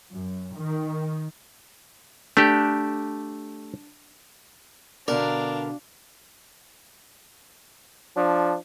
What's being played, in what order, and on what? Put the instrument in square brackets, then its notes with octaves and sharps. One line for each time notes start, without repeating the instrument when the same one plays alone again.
[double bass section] F#2
D#3
[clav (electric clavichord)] A3 G4 [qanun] D4
[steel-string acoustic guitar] B2 D3 [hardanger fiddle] D4 F5 [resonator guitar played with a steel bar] A#4 [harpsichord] D5
[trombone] F3 [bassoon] D4